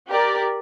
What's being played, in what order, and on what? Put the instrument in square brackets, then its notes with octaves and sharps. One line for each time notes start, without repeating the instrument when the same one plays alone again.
[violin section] G4 A#4 D5